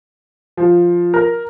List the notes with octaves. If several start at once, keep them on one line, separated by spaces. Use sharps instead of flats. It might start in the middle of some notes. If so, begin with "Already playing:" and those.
F3
A#4